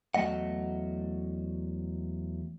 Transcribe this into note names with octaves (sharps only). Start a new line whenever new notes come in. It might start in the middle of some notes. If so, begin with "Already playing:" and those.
E2 F#3 A3 D#5 F#5